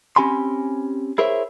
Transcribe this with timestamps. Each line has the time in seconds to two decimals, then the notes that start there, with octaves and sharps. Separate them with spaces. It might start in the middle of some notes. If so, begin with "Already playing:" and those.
0.16 C4 C#4 G4 G#5 B5 C6
1.18 E4 G#4 A#4 C5 C#5 E5